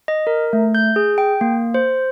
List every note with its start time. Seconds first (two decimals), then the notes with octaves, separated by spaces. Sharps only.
0.08 D#5
0.27 A#4
0.53 A3
0.75 G6
0.96 G#4
1.18 G5
1.41 A#3
1.74 C5